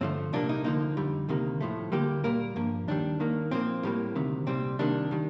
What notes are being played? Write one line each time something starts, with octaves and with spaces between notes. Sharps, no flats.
G2 D3 F3 A3 C4
C2 A#2 G3 A#3 D4
D#4
D2 D3 F3 A#3 D#4
F2 D3 G3
D2 C3 D#3 G3 A#3
A2 F3 A3
D2 D3 G3 A#3 G4
A#2 G3 A#3 A#4
G2 F3 A#3
D#2 D#3 G3 D4
D#2 D#3 A#3
A#2 F3 A#3 C4
A2 G3 A#3
D2 C3 D#3
C2 A#2 G3 C4
C2 C3 D#3 G3 A#3 D4
D#3 G3